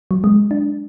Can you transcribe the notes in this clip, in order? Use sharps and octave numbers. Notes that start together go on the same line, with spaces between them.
F#3
G#3
D4